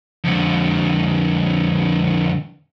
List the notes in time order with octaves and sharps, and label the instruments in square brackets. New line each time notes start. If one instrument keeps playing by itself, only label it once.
[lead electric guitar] F2 D3